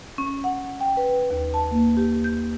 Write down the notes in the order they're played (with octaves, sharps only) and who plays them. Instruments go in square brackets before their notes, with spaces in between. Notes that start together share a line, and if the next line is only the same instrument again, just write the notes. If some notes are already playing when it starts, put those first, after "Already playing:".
[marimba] C#4
F#5
G5
B4
D#2
A5
A#3
G4
G6